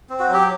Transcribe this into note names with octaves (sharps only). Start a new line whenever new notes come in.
C4
F#4
F#3
G4